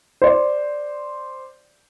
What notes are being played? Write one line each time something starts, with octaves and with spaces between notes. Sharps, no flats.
C5 D5